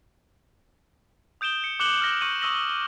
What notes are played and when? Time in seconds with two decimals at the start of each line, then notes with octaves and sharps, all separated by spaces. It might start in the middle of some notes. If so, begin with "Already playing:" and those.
1.41 D#6 G6 D7 E7 G7
1.64 C#7
1.80 D6 F#6 C#7 E7 F#7 G7
2.01 F6 A#6
2.21 C#6 G6 C#7 D#7 F#7
2.41 C#6 D#6 E6 A#6 F#7